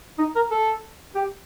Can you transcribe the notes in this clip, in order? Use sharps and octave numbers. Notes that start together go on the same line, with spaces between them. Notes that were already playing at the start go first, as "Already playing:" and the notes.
D#4
A#4
A4
G4